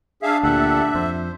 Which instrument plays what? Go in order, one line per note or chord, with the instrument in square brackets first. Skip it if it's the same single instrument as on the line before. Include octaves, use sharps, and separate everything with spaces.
[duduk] D4 [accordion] G#4 E5 F5
[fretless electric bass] D2 A#2 [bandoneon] G4 A4 F#5 [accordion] E5
[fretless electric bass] F2 [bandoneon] C5